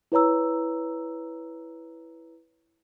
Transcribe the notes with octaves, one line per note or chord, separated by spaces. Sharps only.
E4 B4 C#5 A#5 E6